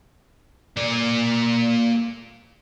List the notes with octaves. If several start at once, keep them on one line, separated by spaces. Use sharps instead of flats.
A#3 D5